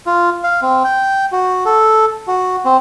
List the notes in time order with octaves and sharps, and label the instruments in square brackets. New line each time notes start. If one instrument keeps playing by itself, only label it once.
[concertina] F4
F5
C4
G5
F#4
A4
F#4
C4